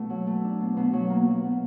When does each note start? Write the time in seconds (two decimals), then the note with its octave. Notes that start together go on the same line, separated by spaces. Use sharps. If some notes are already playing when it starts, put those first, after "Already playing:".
Already playing: B2 A3
0.10 F#3
0.27 A3
0.44 D4
0.60 B2
0.77 B2
0.93 F#3
1.10 A#3
1.27 F#3
1.44 B2